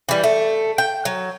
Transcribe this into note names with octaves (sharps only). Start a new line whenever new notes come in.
E3 G3
A3
G5
F#3